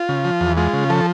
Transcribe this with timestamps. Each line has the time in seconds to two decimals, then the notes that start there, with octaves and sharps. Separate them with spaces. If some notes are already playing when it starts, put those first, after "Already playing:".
Already playing: F4
0.09 C#3
0.25 F3
0.41 E2
0.57 G#3 F4
0.73 C#3
0.90 F3 A4